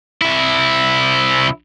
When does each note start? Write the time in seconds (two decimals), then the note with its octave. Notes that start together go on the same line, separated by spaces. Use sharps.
0.22 C2 E4